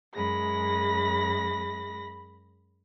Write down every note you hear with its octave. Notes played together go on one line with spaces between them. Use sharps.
F#2 G#3 B5 A#6